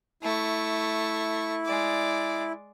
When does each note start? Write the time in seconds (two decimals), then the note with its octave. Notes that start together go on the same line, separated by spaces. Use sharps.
0.23 A3 E4 C#6
1.66 G#3 D5